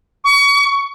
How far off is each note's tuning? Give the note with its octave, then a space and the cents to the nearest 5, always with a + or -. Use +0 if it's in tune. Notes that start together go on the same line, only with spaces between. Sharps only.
C#6 +35